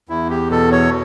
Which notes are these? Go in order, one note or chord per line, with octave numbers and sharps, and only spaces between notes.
E2 E4
G4
B2 A4
C#5